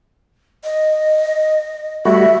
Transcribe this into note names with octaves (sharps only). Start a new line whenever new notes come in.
D#5
G3 A3 F#4 E5